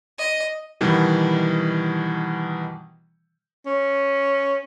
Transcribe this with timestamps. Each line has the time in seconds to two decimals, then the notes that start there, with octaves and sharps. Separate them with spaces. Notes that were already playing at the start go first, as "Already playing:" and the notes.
0.19 D#5
0.81 B2 D#3 E3 G3
3.66 C#4